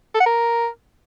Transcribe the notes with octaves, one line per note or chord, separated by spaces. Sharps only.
A4
F#5
A#4